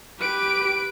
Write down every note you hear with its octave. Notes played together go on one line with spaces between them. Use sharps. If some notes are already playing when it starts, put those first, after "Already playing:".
G4 B4 D7